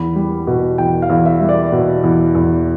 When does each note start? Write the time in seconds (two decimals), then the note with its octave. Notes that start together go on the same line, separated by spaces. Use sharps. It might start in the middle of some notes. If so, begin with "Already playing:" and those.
Already playing: E2 B5
0.16 G3
0.47 B2
0.78 E2 G5
1.02 F5
1.10 E2
1.26 E5
1.41 G3
1.49 D5
1.72 B2
2.04 E2
2.35 E2